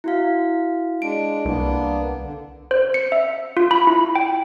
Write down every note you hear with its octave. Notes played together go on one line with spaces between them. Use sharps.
E4 F#4 F5
G#3 D4 D7
C2 A#3 B3 D4
D3
C5
C#7
E5
F4
B5
E4
G5